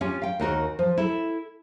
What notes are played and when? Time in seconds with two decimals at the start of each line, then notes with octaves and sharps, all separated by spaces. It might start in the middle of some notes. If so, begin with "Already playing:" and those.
0.01 C#4 F4 G4
0.22 F5 G5
0.40 D#2 D#4 F#4 A#4
0.79 F3
0.98 E4 A4